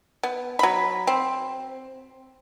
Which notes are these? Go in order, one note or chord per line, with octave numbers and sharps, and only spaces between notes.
B3
F#3 B5
C4